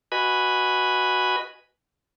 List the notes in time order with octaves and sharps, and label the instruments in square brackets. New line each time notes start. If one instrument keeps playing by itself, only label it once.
[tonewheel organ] F#4 B4 D#5 G#5 B5